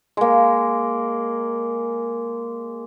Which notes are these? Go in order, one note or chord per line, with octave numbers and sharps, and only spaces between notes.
G#3 A#3